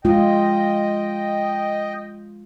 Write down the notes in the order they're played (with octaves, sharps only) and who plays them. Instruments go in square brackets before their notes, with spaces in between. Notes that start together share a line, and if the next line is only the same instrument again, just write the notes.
[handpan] G#3 F4 [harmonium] D#5 G5